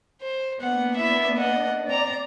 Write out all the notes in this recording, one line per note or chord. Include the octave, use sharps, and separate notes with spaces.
C5
A#3 B3 D4 F#5
E4 E5
D#5 F#5
C4 D5 A#5